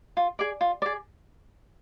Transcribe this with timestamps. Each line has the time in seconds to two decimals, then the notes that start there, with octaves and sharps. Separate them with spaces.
0.17 F4
0.39 G#4 D5
0.61 F4
0.82 G#4 D5